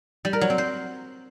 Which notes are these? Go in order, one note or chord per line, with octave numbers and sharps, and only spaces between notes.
G3
A#4
F#3
C4
C5